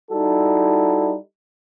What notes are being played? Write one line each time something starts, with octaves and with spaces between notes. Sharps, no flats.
G3 D#4 E4 F#4 A4